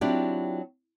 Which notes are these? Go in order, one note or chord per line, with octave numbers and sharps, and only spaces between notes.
F#3 C4 D4 E4 F4 G4